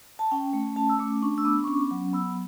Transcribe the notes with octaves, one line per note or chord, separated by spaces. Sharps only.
A5
C#4 G5
A3
C#4 A5
E6
A3 D6
D4 C#6
E6
B3 D6
C#6
C#4 D6
F#3
B3 E6